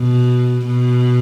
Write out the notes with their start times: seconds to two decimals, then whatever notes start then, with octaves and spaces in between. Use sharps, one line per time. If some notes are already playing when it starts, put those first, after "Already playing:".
Already playing: B2
0.66 B2